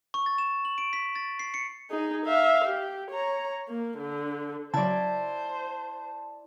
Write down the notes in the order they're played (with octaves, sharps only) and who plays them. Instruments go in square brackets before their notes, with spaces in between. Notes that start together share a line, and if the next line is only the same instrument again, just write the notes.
[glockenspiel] C#6
A6
E7
F#7
D7
B6
A6
C7
C#7
[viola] D#4 G#4
E5 F5
G4
C#5 A#5
A#3
D3
[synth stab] C#3 F#3 [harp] E4 D5 [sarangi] C5 [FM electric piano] A5